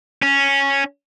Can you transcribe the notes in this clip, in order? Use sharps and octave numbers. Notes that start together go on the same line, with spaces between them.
C#4